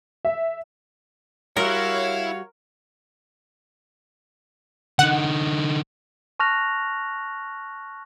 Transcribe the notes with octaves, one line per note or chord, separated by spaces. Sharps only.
E5
G3 E4 F#4 A#4 C#5 E5 F5
D3 D#4 F#5
A5 C#6 F6 F#6 A#6 F7